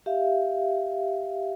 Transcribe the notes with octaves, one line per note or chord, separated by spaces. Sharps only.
G4 E5 F5